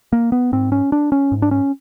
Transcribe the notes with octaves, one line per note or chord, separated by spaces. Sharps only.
A#3
B3
G#2 C4
C#4
D4
C#4
G#2
D4
C#4